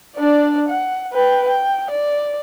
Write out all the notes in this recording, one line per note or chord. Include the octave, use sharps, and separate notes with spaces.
D4 D5
F#5
B4 G5
G5
D5